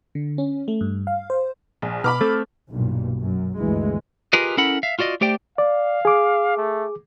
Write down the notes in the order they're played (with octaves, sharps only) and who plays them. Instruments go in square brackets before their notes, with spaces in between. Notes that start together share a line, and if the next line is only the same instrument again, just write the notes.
[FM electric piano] D3
C#4
A3
G2
F5
C5
[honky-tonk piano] A#1
[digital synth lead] B2 [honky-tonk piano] B5 D6 F6
[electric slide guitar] A3 C4 [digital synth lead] A4
[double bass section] B1 G2 A#2
F#2
G1 D2 E3 G#3
[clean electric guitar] F4 G4 G#4 A#4 B4 D#5
C#4 E4 A4 A#4 F#5 B5
E5 F5
F4 F#4 D5 D#5
A3 G4 C5 D5 G5
[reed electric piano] D5 [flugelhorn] F5
[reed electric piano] G#4 D6
[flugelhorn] A3